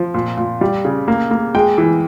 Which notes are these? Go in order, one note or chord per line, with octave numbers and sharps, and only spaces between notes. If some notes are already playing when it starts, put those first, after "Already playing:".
Already playing: F3
A#2
A#2
G3
C#3
A#3
A#3
G#3 G5
E3